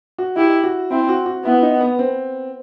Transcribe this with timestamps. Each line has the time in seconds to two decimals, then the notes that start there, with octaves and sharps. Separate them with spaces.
0.18 F#4
0.36 E4 G4
0.64 F#4
0.91 C4 E4
1.09 F#4
1.26 F#4
1.45 B3 E4
1.63 D#4
1.81 B3
1.99 C4